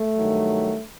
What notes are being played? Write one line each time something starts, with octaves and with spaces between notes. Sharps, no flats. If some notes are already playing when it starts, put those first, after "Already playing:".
Already playing: A3
G2 D#3 F#3